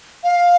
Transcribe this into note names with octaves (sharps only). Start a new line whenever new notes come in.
F5